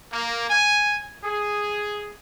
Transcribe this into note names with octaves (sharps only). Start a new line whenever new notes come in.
A#3
G#5
G#4